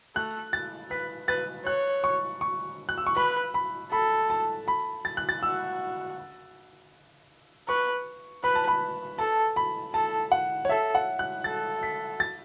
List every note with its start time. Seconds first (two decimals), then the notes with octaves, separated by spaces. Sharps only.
0.15 A3 F#6
0.53 A6
0.91 B4 B6
1.28 B4 A6
1.66 C#5 F#6
2.04 C#6
2.41 C#6
2.89 F#6
2.98 E6
3.07 C#6
3.16 B4 B5
3.54 B5
3.92 A4 B5
4.30 A5
4.68 B5
5.05 A6
5.17 F#6
5.29 A6
5.42 F#4 E6
7.68 B4 C#6
8.44 B4 B5
8.55 A5
8.68 B5
9.18 A4 A5
9.56 B5
9.94 A4 A5
10.32 F#5
10.65 C#5
10.69 A4 E5
10.95 F#5
11.19 F#6
11.44 A4 A6
11.83 B6
12.20 A6